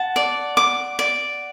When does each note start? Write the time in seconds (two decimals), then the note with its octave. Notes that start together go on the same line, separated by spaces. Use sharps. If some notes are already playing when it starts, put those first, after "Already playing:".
Already playing: F#5 A5
0.16 D5
0.57 D6
0.99 D5